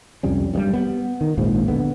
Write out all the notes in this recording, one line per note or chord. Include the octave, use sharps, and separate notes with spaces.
C2 F2 G3 C#4
D2 G2 G3
B3
D#3
A#1 D#2 G#2 F3
D3 B3